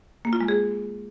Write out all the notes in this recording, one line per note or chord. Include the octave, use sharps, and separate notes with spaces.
A#3
F4
G#3
G#4